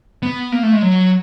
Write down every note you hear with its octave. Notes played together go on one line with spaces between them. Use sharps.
B3
A#3
A3
G#3
F#3